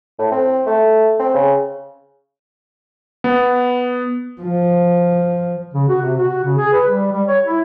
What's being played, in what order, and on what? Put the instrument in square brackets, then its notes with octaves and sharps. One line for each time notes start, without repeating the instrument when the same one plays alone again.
[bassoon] A2
C4
A3
C4
C#3
[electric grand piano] B3
[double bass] F3
[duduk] C#3
F#4
C3
F#4
C#3
G#4
B4
G3
G3
C#5
E4